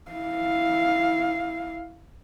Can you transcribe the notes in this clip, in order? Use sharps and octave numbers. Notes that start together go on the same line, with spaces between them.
E4 F5